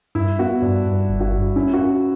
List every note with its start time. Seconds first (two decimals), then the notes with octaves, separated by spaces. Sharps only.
0.15 G2 E4
0.39 B3 F#4
0.62 G2 D4
0.85 G2
1.09 G1
1.20 F#4
1.32 G2
1.56 C#4 E4
1.74 F#4
1.79 C#4